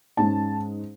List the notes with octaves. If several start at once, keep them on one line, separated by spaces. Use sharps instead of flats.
G#2 G#3 C#4 A5